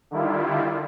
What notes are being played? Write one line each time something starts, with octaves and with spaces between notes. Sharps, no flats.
D3 D#3 G3 E4 F4